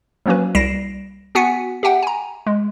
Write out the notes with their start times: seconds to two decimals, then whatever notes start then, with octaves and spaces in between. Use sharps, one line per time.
0.26 F3 F#3 A#3 C#4 F#4 B4
0.55 C2 G3 A#6 C7 D7 E7
1.35 B3 F#4 F#5 G#5 B6 C#7
1.83 G4 E5 F#5 G5
2.03 G#5 A#5
2.46 G#3